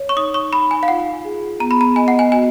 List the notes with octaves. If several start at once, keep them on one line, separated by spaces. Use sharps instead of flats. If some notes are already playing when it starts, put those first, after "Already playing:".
Already playing: C#5
C#6
D#4 D#6
C#6
D#4 B5
G#5
F5
F4 F#5
G#4
B3 A#5
B5
A#5
D#5 G#5
F#5
G#5
F#4 G#5